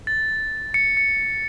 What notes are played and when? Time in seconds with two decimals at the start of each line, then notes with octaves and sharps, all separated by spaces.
0.07 A6
0.74 C#7
0.97 C#7